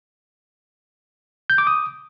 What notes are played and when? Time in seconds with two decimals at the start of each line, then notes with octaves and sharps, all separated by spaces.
1.50 G6
1.58 D6
1.67 D#6